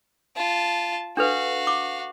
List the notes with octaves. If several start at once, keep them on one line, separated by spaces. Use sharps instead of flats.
F4 A5
D4 F#4 A4 B4 F5
D6